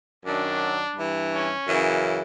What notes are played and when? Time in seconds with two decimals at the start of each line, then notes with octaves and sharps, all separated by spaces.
0.26 F#2 D#3 F#3 D4
0.96 G2 E3
1.32 C#4
1.67 F#2 C#3 E3